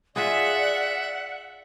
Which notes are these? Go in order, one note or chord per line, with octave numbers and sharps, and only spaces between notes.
F4 G#4 D5 E5 F#5